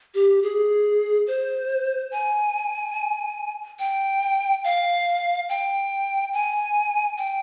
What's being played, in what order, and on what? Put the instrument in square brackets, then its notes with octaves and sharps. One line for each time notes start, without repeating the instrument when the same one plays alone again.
[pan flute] G4
G#4
C5
G#5
G5
F5
G5
G#5
G5